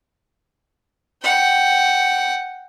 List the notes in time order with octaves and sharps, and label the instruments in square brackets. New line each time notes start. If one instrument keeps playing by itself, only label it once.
[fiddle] F#5 G5